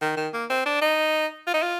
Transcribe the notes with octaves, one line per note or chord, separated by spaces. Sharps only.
D#3
D#3
A#3
C4
D4
D#4
F4
D#4
F4